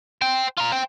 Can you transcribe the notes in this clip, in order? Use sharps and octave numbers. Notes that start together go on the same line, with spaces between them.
C5 G5
F4 A#5
C5 G5